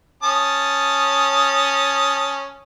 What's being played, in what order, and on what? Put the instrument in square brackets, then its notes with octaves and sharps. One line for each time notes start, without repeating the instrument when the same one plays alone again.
[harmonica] C#4 A5 D#6